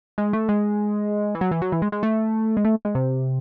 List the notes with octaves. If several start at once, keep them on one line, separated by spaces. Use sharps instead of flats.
G#3
A3
G#3
E3
F#3
E3
F#3
E3
G#3
G#3
A3
G#3
A3
G#3
C3